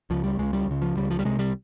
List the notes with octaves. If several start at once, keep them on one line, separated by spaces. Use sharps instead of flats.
C#2 C#3 F3
G3
C#2 C#3 G#3
G3
C#2 C#3
F3
C#2 C#3 G3
F3
G3
C2 C3 G#3
G3